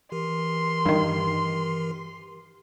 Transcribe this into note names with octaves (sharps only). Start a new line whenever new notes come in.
E3 G4 A#4 C6
G2 D#3